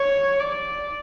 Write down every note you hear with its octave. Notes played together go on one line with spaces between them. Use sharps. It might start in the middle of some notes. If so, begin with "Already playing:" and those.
Already playing: C#5
D5